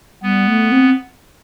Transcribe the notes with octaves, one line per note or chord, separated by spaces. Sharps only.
G3 B3
A3
C4